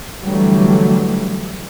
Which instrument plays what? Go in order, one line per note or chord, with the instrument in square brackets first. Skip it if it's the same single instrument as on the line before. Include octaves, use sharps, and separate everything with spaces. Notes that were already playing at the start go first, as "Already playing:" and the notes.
[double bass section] D3 E3 F#3 G3 A3